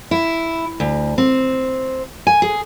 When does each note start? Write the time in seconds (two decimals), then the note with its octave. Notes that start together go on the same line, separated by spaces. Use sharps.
0.11 E4
0.80 D2
1.18 C4
2.27 G#5
2.42 G#4